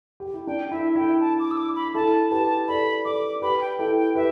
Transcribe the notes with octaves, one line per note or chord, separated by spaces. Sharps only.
G4
E4
D4 G5
E4 E5
E4 G5
A5
D6
E6
D6
B5
E4 A4 A5
G4 B4 A5
A4 D5 B5
A4 D5 D6
G4 B4 B5
G5
E4 A4 G5
G5
G4 B4 E5